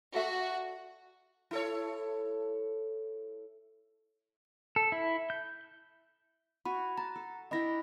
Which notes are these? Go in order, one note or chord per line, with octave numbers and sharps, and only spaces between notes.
F#4 A4 D5 E5
E4 A4 C#5
A4
E4
G6
F#4 G#5 B5
A5 A#5
A4
D4 E4 D#5 G5 B5 A#6